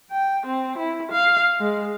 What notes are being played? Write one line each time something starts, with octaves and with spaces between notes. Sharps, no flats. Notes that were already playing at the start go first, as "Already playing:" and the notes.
G5
C4
E4
F5
G#3